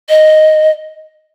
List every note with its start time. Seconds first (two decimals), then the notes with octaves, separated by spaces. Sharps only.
0.09 D#5